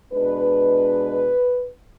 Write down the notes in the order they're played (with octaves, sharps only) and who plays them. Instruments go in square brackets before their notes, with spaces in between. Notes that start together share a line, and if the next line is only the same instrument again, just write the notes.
[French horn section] B2 G#3 D4 B4